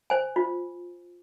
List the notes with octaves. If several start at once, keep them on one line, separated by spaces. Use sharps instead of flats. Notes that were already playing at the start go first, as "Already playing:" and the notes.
C5 G#5
F4